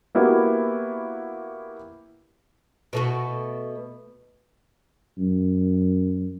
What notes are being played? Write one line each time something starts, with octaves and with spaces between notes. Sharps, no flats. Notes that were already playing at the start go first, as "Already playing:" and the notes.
A#3 B3 E4 F#4 G4
B2 A3 F#4
F#2